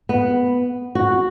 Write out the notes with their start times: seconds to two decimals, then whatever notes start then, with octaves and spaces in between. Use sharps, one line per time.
0.09 B3
0.95 F#4